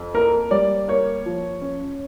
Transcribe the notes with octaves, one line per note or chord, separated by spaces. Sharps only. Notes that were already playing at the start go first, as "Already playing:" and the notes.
Already playing: F2
A#3 A#4
G3 D5
A#3 C#5
F3
C#4